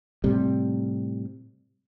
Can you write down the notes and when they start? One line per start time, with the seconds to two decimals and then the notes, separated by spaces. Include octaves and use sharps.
0.24 A2 C3 G3